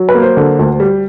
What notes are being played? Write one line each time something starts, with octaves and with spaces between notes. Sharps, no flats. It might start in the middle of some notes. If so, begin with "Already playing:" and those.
Already playing: F#3
B4
A#3
C5
D3
D2
G3